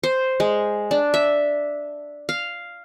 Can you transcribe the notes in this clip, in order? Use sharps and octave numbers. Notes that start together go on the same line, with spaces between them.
C5
G#3
D4
E5
F5